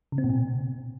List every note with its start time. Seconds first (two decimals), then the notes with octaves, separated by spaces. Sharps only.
0.12 C#3
0.18 C4
0.24 A#2
0.30 B2